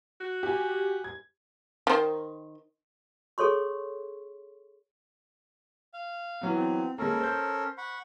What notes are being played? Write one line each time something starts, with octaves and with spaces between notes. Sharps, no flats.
F#4
G4 G#5
G#6
D#3 C5
G#4 A4 C#5 C6 C#6
F5
E3 F#3 B3
C4
G#3 A#3 C#4 A4 A#4
C5 G6
F#5 B5 C#6